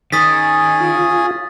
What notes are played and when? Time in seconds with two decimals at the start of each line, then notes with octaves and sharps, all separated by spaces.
0.12 D#3 C#4 G#4 G#5 D#6 A6 B6
0.80 F4